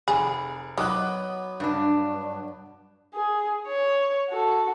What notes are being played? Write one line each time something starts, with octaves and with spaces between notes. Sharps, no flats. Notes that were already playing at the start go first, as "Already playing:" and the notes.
F1 G#4 B5
D#3 F#3 B3 B4 D6 D#6 F#6
G2 D4
G#4
C#5
F#4 A4